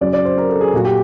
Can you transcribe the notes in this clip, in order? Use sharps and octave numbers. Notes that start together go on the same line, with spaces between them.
F#2 C#3 F#3 D5
D5
C5
A#4
A4
G#4
A#2 F#3 A#3 F#4
G4